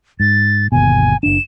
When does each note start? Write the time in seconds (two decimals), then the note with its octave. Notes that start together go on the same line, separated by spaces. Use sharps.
0.20 G#2 A6
0.72 G1 D#2 B2 G#5
1.23 F#1 D4 E7